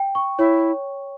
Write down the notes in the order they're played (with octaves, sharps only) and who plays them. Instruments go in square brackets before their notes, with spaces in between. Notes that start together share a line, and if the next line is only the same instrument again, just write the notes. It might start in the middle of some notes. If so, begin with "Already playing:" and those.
Already playing: [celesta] G5
C#6
[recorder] E4 [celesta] C#5